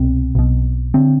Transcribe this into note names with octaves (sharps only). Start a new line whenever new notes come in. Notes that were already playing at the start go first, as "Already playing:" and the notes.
Already playing: C2 B2 C4
B1 B2
D3 C4